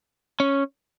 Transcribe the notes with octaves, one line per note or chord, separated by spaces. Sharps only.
C#4